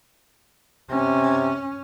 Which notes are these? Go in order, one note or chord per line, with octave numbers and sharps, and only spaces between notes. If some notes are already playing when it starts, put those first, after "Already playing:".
C3 C#4